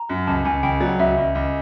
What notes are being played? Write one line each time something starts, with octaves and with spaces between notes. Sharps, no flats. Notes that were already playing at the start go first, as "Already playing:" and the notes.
Already playing: A#5
F#2
C#2 A5
C#2 G#5
C#2 G5
F#3 D5
C#2 E5
C#2
C#2